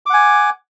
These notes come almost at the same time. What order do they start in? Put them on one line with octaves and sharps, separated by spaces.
D6 F#5 G#5